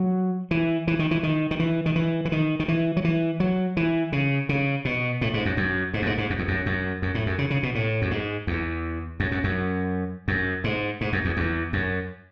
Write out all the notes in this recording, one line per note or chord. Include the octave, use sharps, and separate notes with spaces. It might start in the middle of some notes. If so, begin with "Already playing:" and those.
Already playing: F#3
E3
E3
D#3
E3
D#3
D#3
E3
D#3
E3
E3
D#3
D#3
E3
F#3
E3
F#3
E3
C#3
C#3
B2
A2
G#2
F#2
F#2
G#2
F#2
G#2
G#2
F#2
E2
F#2
F#2
F#2
A2
F#2
C#3
C#3
B2
A2
F#2
G#2
E2
F#2
F#2
F#2
F#2
G#2
G#2
F#2
E2
E2
F#2